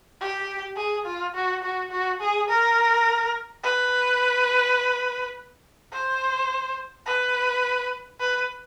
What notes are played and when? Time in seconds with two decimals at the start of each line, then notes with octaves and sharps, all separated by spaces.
0.21 G4
0.77 G#4
1.06 F4
1.34 F#4
1.63 F#4
1.91 F#4
2.21 G#4
2.49 A#4
3.63 B4
5.92 C5
7.06 B4
8.20 B4